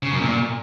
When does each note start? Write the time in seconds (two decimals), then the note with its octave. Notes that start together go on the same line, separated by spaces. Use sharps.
0.03 C#3
0.12 F#2
0.21 A#2